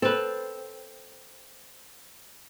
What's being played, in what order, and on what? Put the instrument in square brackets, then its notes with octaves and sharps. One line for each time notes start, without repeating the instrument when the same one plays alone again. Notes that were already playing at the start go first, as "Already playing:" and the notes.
[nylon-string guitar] C4 [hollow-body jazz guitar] A4 B4